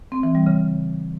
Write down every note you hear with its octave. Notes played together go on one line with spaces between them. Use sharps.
C4
E3
G3
C#3